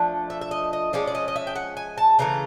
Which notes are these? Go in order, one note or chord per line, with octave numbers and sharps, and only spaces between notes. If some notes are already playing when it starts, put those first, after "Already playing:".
Already playing: F3 A3 D4
E5
E5
D#5
D#5
F3 G#3 C#4 D5
D5
D#5
D#5
E5
G5
F#5
G#5
A5
C#3 E3 A3 A#5